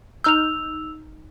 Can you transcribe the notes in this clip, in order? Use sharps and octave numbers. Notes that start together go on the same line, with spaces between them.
D#4 E6 F6 G6 F7